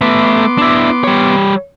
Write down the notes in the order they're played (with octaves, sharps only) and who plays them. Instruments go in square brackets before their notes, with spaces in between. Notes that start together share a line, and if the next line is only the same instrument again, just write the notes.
[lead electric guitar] A3 B4 [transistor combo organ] B3 C6 D6
[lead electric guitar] D4 E4
G3 C#5